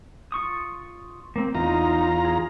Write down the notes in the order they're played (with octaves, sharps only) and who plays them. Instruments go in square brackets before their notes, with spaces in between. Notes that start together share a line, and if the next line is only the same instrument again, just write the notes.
[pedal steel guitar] F4 C#6 D#6
A#3 C4
[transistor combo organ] E2 F4 A#5 [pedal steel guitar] D#4
[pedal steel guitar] G#4